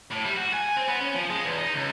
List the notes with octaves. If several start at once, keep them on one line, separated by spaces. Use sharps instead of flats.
A2
G3
F#4
G#5
C4
B3
C#4
F3
G#3
E2
D#4
C#2